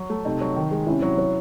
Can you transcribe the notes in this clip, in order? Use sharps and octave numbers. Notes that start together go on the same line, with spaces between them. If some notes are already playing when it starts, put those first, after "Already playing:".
Already playing: F#3
A3
C3 D#4
F#3
D#3
G#3
C3 C#4 E4
F#3
F#3